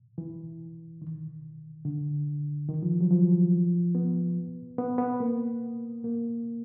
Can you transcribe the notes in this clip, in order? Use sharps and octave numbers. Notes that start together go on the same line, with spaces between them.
E3
D#3
D3
D#3
F3
F#3
F3
B3
B3
B3
A#3
A#3